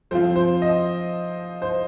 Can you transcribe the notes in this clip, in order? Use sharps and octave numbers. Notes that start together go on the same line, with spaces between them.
F3 C4 F4 C5
C5
D#5
C5